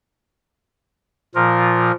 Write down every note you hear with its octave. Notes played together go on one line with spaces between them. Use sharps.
A#2 F3 F4 A#4